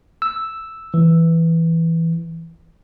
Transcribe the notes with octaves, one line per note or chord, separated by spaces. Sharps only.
E6
E3